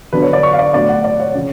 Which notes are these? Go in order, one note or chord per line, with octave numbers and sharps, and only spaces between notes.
D3 F#3 B3 D4 B4
C#5
D5
C#6
F5
D5
A2 F#3 B3 D4 D5
F#5
D5
C#5
C#3 F3